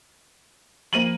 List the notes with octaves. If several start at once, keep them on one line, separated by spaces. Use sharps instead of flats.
F3 A#3 C5 D#7 F#7